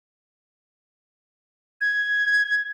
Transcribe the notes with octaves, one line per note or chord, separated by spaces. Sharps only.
G#6